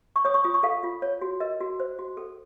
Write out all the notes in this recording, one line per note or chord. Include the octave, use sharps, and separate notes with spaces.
C#6
C#5 D#6
C#6
F4 D#6
C#6
A4 F5
F4
C#5
F#4
A#4 D#5
F#4
C5
F#4
A4